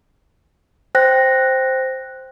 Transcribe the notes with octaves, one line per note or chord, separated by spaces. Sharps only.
C5 G5 F#6 A#6